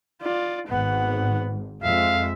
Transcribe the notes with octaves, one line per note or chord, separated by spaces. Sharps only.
F4 D5
G#1 G#2 B3 F#5
F2 G#3 E5 F5